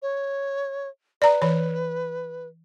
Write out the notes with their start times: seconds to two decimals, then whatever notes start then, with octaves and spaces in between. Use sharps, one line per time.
0.02 C#5
1.22 B4 D5 A#5
1.42 E3 C#5